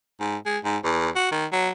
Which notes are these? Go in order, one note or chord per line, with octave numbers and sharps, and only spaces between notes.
G#2
G#3
G#2
E2
F#4
D#3
F#3